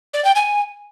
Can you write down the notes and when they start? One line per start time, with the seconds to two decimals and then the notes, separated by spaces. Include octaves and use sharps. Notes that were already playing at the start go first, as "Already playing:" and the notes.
0.14 D5
0.25 G5
0.35 G#5